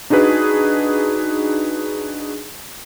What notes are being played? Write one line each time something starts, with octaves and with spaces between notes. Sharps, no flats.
D4 D#4 F#4 G#4 B4